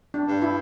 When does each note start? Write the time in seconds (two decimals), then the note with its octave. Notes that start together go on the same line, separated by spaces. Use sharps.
0.14 D4
0.28 G2
0.42 E4